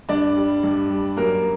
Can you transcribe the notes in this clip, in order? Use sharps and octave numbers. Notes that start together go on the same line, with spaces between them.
G2 D4 D5
G3
G2
G3
F#2 A#3 A#4